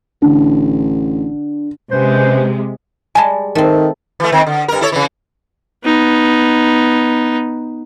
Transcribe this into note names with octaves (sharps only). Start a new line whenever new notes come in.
A1 D3
C3 G#3 C#4 B4 C5
G3 G#3 G#5 A5
D#3 A3 C4
E3 A3
D#3 C4
D3
G2 A#4
E4 A4 C#5
C#3 E3
B3 D#4